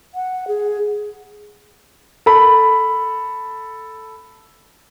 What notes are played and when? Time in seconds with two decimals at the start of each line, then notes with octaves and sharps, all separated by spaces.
0.15 F#5
0.48 G#4
2.26 A4 B5